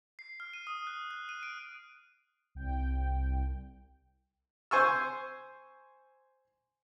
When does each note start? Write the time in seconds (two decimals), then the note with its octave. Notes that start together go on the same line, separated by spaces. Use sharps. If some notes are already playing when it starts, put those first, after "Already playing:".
0.19 C7
0.40 F6
0.53 D#7
0.67 D#6
0.87 F#6
1.11 F#6
1.29 D#7
1.43 D7
2.55 C2 G5
4.71 C5 G#5 C#6 E6